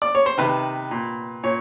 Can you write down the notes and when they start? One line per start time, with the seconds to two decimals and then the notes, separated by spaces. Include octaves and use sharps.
0.02 D5
0.15 C#5
0.26 C5
0.38 C3 D#3 B4
0.91 A#2
1.43 A#2 C#5